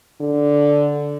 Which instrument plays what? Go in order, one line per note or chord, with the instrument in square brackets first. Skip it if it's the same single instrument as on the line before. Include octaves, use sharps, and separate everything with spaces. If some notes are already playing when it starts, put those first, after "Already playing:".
[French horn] D3